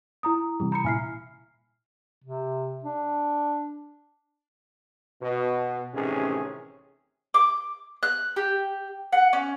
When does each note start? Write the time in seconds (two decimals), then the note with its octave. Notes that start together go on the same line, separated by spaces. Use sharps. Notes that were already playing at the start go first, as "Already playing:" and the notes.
0.23 E4 A#5 D#6
0.60 C3 E3 G3
0.72 A#5 B5 C#7
0.85 A#2 E4 G#5 F6 C7
2.24 C3
2.84 D4
5.22 B2
5.94 A1 C3 D#3 C#4 G#4
7.34 D6
8.03 F#6
8.36 G4
9.12 F#5
9.33 C#4